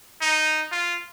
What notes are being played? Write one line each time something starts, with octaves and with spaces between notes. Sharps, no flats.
D#4
F4